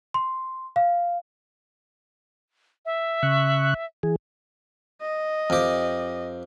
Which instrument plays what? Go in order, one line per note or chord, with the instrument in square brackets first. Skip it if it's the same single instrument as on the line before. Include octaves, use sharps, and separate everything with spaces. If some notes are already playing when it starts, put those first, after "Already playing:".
[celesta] C6
F5
[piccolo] E5
[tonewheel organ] C#3 C#6 F#6
E3 G#4
[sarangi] D#5
[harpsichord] F2 G4